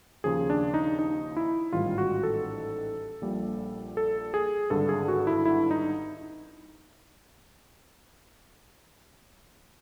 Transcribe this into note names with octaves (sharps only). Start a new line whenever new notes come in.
D#2 C#3 F3 G#4
D4
D#4
D#4
E4
A1 G#2 D#3 G3 F4
F#4
A4
A#1 A#2 G3
A4
G#4
G#1 G2 D3 A4
G#4
F#4
E4
E4
D#4